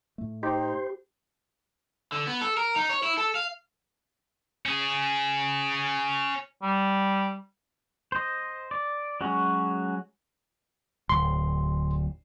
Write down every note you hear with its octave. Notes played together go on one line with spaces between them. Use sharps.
A2 A3
D#4 G4 C5
D3
B3
A4
A#4
D#4
C#5
E4
A4
F5
C#4 G#4
G3
C5 D#5
D5
F#3 G#3 C#4 F#4
D1 C6